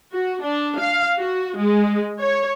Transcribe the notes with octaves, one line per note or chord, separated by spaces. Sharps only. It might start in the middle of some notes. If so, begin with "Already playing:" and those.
F#4
D4
F5
F#4
G#3
C#5